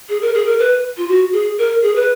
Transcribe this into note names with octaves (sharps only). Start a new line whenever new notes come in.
G#4
A#4
G#4
A#4
B4
F4
F#4
G#4
A#4
G#4
B4